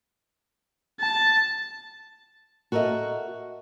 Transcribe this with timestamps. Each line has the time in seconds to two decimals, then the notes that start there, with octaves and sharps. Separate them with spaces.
1.01 A5
2.72 F#4 A4 A#4 C#5 D#5 E5